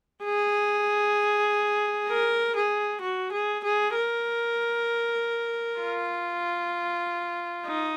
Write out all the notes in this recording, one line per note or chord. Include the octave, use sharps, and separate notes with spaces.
G#4
A#4
G#4
F#4
G#4
G#4
A#4
F4
D#4